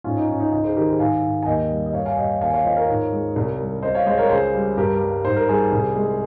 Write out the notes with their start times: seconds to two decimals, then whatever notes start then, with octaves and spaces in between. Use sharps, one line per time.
0.04 G#2 C#4 F4
0.17 D#4
0.29 G#2 C#4
0.40 D#4
0.52 C#2 D#4
0.64 G#4 C5
0.76 D#3 G4 A#4
0.88 G#4 C5
0.99 G#2 F5 G#5
1.23 G#2
1.43 G#5
1.46 D#2 D#5 G5
1.71 G3
1.86 D#5
1.93 G2 C#5 F5
2.06 F5 G#5
2.17 G2 D#5 G5
2.41 D#2 F5 G#5
2.53 C#5 F5
2.64 F3 C5 D#5
2.76 A#4 C#5
2.89 G#2
3.12 G#3
3.36 C2
3.59 G3
3.82 C#2 C5 D#5
3.95 C#5 F5
4.06 G#3 C5 D#5
4.18 A#4 C#5
4.30 C#2 G#4 C5
4.54 G3
4.77 G2 G4 A#4
5.01 G3
5.24 G#2 C5
5.36 A#4
5.48 G3 G#4 C5
5.72 C2
5.96 G#3